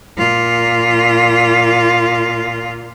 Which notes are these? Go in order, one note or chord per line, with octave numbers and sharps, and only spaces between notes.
A#2 F4